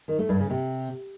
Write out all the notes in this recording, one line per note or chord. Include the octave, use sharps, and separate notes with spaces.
D#3
A3
G2
C#3
C3